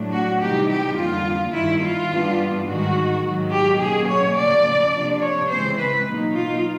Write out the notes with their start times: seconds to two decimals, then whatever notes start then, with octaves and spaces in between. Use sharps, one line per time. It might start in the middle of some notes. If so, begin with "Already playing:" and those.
Already playing: A2 F#3 A3 D4
0.12 F#4
0.40 C3 E3 G3 C4 D#4 G4
0.69 G4
0.97 F2 D3 G3 A#3 F4
1.54 G2 D#3 G3 E4
1.82 F4
2.10 G2 E3 G3 B3 D4
2.67 G#2 D#3 G#3 F#4
3.23 G#2 D#3 F#3
3.52 G4
3.80 B2 F#3 A#3 C#4 G#4
4.09 C#5
4.37 C#3 F3 A#3 D5
4.93 C3 F3 A#3 D4
5.21 C#5
5.50 C#3 E3 G#3 C4 C5
5.78 B4
6.07 B2 F#3 A#3 D#4
6.35 F4